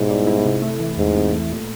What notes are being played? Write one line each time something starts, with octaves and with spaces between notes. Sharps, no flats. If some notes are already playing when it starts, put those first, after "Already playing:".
Already playing: G#2 B2 G3 B3 E4
G3
E4
C3
A3
E3
E2 G#2
C3
A3
A#2